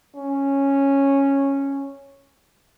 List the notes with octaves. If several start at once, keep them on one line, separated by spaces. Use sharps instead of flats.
C#4